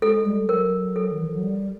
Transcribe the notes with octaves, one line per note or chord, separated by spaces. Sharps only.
G#3 A4
G3
F#3 A#4
A4
D#3
E3
F3
F#3
G3